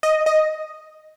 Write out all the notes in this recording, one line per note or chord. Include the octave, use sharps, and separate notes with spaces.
D#5
D#5